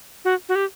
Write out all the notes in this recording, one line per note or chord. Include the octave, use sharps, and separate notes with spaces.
F#4
F#4
G4